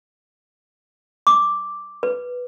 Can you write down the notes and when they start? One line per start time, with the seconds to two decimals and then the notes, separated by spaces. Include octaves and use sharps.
1.27 D6
2.03 B4